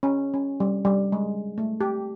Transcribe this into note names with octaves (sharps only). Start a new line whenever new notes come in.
C#4
C#4
G3
G3
G#3
A3
G4